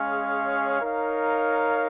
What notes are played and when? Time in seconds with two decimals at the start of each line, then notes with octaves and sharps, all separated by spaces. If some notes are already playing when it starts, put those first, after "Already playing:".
Already playing: G#3 C#4 G#4 C#5 F5
0.81 D#4 A#4 C#5 F5